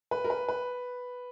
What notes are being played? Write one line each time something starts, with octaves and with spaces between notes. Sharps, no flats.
B4
A#4
B4
B4